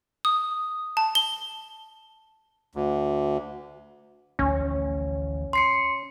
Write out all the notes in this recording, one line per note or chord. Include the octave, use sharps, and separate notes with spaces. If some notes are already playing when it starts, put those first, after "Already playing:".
D#6
A5
G7
D2
A1 D2 F3 C#4
C6 C7 C#7